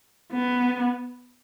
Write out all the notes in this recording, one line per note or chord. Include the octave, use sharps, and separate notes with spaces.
B3